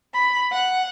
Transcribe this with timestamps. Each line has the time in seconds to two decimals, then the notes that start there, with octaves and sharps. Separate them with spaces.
0.14 B5
0.51 F#5